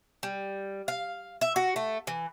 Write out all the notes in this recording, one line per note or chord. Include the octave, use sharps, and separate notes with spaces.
G3
F5
E5
F#4
A3
E3